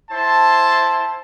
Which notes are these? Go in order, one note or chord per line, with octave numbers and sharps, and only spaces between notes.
E4 C5 A5